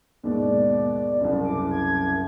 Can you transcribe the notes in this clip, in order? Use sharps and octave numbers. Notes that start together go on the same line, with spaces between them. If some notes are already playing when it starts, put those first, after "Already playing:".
D#2 G#2 B2 D5
F#1 C2
D6
G#6